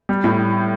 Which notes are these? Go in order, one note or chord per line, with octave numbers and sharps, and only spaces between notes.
G3
A2